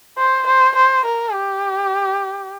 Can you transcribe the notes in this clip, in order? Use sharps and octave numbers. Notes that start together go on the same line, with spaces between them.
C5
C5
C5
A#4
G4